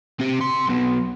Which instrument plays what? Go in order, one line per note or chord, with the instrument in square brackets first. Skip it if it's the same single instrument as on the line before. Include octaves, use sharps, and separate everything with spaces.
[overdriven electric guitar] C4 G4
C3 C6
B1 B2